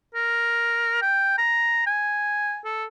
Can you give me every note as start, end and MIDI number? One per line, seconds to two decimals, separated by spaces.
0.15 1.00 70
1.02 1.35 79
1.38 1.86 82
1.87 2.60 80
2.65 2.85 69